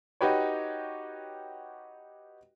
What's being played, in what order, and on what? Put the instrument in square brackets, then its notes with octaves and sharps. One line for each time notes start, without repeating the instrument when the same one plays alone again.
[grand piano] D#4 F#4 G4 B4 C#5